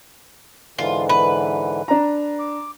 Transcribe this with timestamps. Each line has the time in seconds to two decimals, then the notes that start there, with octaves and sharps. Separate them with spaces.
0.78 G#2 D3 E3 F4
1.09 B4
1.88 D4 A#5
2.39 D6